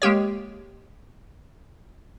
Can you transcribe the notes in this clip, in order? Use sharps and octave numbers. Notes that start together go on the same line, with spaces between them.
G#3 A#3 G4 C#5